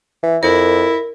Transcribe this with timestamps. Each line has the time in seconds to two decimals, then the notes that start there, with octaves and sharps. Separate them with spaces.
0.23 E3
0.43 F2 E4 A#4